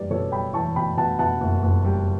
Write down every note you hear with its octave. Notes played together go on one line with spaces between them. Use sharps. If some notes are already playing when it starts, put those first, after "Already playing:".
Already playing: F#1 E2 G3 B4 D5
B2 A4 C#5
G3 G5 B5
E2 A5 C#6
B2 G5 B5
B2 F#5 A5
B2 F#5 A5
F#1
F#1
G3